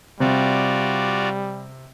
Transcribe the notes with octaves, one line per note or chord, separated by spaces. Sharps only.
C3 G3 F4 F#4 D5